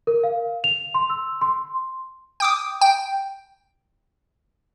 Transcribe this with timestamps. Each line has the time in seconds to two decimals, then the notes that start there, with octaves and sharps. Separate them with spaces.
0.07 A#4
0.24 F5
0.64 F7
0.94 C6
1.10 E6
1.41 C6
2.40 G5 D6 D#6
2.81 G5